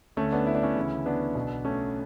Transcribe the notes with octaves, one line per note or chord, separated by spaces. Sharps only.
D2 D3 A3 C#4
B3 D4
E4
D4
C#4 E4
D2 C#3 E3
B3 D4
B1 B2
A3 C#4